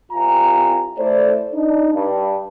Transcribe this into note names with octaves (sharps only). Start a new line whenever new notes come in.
C2 C3 F4 G#5 A#5
A3 E4 A4 C5 D5
D4 D#4
G2